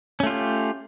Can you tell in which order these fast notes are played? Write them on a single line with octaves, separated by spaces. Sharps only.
C#4 A3 F4 G4